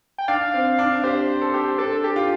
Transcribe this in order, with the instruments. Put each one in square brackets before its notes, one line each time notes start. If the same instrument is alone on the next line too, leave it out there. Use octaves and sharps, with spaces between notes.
[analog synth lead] G5
[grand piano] D4 [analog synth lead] F5
[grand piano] C4
D4
[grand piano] G4 [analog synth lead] C5
[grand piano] A4
G4
[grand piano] D4 [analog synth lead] A4
[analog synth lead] G4
[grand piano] F4